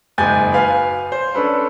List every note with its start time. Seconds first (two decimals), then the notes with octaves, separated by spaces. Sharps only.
0.18 F#1 G#2 G#5 G6 A6
0.53 B4 F5 G#5 F6
1.12 C5
1.35 C#4 D4 A4 B4